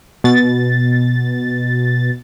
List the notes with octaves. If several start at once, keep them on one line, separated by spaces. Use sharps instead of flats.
B2 A6